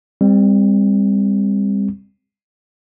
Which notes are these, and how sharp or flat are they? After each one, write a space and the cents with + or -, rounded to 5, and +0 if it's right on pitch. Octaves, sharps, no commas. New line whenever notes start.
G3 +35 C4 +0